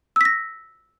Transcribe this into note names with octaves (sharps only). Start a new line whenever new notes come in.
E6 A#6 B6